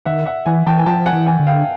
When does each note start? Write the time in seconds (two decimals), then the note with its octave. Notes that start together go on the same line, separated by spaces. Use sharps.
0.05 D#3 E5 F#5
0.26 E5 F#5
0.46 E3 F#5 G#5
0.67 E3 G5 A5
0.78 G#5
0.86 F3 G5 A5
1.06 F#5 G#5
1.13 E3
1.26 F#5 G#5
1.40 D3
1.47 F5 G5